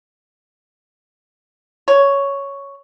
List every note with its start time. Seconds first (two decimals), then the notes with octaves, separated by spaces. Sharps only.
1.88 C#5